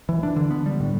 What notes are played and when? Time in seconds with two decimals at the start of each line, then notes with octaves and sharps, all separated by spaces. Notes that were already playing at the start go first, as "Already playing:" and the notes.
0.09 E3
0.23 D4
0.36 D3
0.51 B3
0.66 G3
0.80 A2